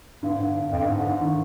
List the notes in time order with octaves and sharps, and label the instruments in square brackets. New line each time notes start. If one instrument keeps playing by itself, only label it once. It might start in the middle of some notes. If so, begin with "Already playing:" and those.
[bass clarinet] G2 [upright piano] D3
[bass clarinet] G#2
G2
F2
G2
[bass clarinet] G#2 [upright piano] D3
[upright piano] D3
D#3